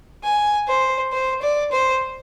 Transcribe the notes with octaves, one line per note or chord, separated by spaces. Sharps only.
G#5
C5
C5
D5
C5